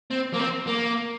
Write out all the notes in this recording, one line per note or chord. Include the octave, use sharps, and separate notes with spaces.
C4
A#3
C4
A#3